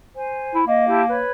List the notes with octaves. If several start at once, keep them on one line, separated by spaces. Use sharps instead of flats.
C5 G#5
E4
A#3 D#5
E4 G4 A5
B4 C#5